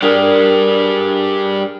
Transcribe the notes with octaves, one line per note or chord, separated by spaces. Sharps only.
G3 D4 G#4 A#4